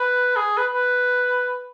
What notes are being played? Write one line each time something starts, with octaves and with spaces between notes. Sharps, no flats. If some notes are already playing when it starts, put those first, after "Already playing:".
Already playing: B4
G#4
B4
B4